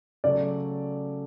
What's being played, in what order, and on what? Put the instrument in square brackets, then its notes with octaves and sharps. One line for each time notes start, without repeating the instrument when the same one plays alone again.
[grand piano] C#3 F#3 A3 [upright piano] D5